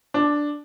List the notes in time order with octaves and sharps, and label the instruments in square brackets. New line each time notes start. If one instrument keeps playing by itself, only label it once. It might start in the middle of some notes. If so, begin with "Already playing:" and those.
[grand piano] D4